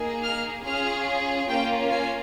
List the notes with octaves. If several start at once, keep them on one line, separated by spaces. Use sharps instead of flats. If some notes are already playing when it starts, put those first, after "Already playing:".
Already playing: A#3 D#4 G#4
F6
C#4 F4 G#4 F6
A#3 C#4 F4 G5
G#5